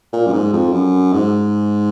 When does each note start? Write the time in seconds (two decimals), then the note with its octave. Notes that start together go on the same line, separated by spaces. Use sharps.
0.13 A#2
0.27 F#2
0.32 G#2
0.53 F2
0.72 F#2
1.13 G#2